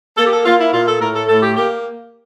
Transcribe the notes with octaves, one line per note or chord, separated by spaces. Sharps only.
A#3 A4
G4
A4
A#3 F4
E4
A#2 F4
A4
A2 A#4
A4
A2 A4
G4
A#3 G4